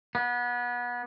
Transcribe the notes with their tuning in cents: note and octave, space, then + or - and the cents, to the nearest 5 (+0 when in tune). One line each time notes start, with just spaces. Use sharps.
B3 -25